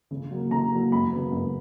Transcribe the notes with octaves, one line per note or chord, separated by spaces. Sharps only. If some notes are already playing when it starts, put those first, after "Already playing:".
C#3
F#3 A#3
C#3 A#5
F#3 A#3
F#2 B5
C#3 F#3 B3
F#2